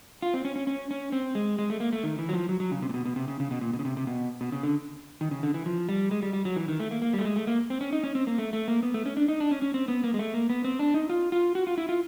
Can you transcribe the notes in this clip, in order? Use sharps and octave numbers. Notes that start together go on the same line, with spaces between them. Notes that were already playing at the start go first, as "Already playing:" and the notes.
F4
C4
C#4
C#4
C#4
C#4
C4
G#3
G#3
A3
A#3
A3
D#3
E3
F#3
F3
F#3
F#3
C#3
C3
A#2
B2
B2
C3
C#3
C#3
B2
A#2
B2
C#3
C3
C3
B2
B2
C#3
D3
D#3
C#3
D3
E3
F3
G3
G#3
G3
G3
F#3
E3
D#3
A3
A#3
A#3
G3
A3
G#3
A3
A#3
C4
C#4
D#4
C#4
C4
A#3
A3
A3
A#3
B3
A3
C#4
D4
D#4
D4
C#4
C#4
C4
B3
A#3
G#3
A3
A#3
B3
C4
D4
D#4
F4
F4
F#4
F4
E4
F4